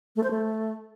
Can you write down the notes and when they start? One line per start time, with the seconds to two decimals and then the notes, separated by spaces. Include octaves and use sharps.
0.16 A3
0.23 C5
0.31 A3